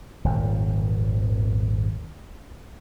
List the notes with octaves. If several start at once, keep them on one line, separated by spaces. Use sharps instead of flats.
D#1 G#1 F2